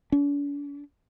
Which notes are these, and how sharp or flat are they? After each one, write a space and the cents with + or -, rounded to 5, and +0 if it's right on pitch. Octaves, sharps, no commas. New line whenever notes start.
D4 -45